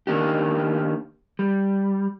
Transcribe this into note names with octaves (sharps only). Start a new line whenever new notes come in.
D#3 A#3 D4 G4
G3